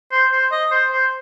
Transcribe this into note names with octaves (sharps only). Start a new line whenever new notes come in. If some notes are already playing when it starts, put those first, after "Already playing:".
C5
C5
D#5
C5
C5